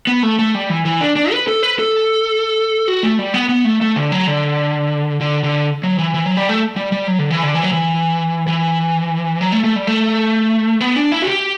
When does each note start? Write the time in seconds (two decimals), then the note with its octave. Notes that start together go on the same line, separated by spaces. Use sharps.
0.07 B3
0.23 A3
0.39 A3
0.55 G3
0.69 E3
0.85 E3
1.01 D4
1.16 D4
1.32 B4
1.48 A4
1.63 B4
1.79 A4
2.88 F#4
3.03 A3
3.19 G3
3.34 B3
3.49 B3
3.65 A3
3.81 A3
3.96 D3
4.12 F#3
4.27 D3
5.21 D3
5.43 D3
5.83 F#3
5.98 E3
6.14 E3
6.26 F#3
6.37 G3
6.49 A3
6.76 G3
6.92 G3
7.07 F#3
7.19 D3
7.31 E3
7.43 D3
7.54 E3
7.63 F#3
7.73 E3
8.47 E3
9.41 F#3
9.52 A3
9.64 A3
9.76 G3
9.87 A3
10.81 B3
10.96 D4
11.12 E4
11.22 F#4
11.27 G4